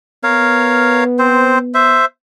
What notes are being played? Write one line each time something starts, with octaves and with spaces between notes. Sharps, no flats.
B3 A#4 C#5 F5
C4 C5
C5 E5